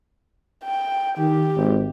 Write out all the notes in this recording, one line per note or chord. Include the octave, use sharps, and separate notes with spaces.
G5
D#3 G4
G#1